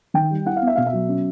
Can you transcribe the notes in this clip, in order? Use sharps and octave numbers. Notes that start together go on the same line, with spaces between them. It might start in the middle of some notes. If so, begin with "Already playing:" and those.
D#3 G5
G3
E4 F#5
F5
B3
E5
B2 F5
E5
F#3
C#4